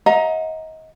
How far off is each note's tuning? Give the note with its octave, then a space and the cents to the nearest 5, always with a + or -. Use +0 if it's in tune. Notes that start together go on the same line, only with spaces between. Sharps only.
D#5 +30 F#5 -45 A#5 +0